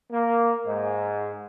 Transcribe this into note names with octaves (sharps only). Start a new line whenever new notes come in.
A#3
G#2